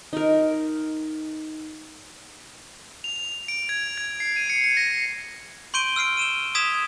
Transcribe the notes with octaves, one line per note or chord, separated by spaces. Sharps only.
D#4 A#4
F7
F7
D7
G#6
G#6
C7
D#7
C#7
C#7
A#6
C6 C#6 G6 D7 D#7 G7
E6 F6 C7 D7
D#7 E7 G7
D#6 E6 G#6 B6 E7 F7